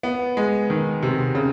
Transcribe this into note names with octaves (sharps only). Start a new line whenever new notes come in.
B3
G#3
D#3
C3
C#3